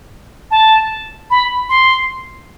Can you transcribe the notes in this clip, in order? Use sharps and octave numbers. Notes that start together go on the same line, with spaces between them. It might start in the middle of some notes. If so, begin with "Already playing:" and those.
A5
B5
C6